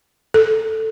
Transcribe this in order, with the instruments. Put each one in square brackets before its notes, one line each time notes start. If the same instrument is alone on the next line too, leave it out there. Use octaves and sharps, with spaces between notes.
[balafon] A4